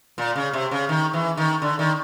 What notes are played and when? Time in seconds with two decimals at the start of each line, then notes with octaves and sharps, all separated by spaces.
0.18 A#2
0.36 C#3
0.53 C3
0.71 C#3
0.89 D#3
1.13 E3
1.37 D#3
1.62 D3
1.79 D#3